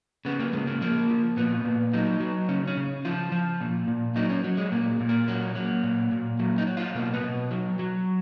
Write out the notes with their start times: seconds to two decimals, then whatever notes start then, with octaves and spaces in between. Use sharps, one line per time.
0.25 C#3 B3
0.40 A#3
0.53 C#3 G#3
0.67 A#3
0.81 F3 A#3
1.10 F3
1.37 A#2 B3
1.65 A#2
1.93 F#3 D#4
2.20 F#3
2.48 C#3 C#4
2.67 C#4
2.77 C#3
3.05 F3 F4
3.32 F3
3.60 A#2
3.88 A#2
4.16 F#3 D#4
4.29 C#4
4.44 F#3
4.57 G#3
4.72 A#2 A#3
5.00 A#2
5.09 A#3
5.28 F#3
5.55 F#3
5.83 A#2
6.12 A#2
6.39 F#3
6.58 D#4
6.67 F#3
6.77 F4
6.94 B2 A#3
7.14 B3
7.23 B2
7.51 F#3
7.79 F#3